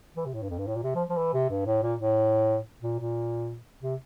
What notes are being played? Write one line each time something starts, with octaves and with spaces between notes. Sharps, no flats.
E3
C3
A2
G2
F2
G2
A2
A#2
C3
F3
F3
E3
C3
G2
A2
A#2
A2
A#2
A#2
C3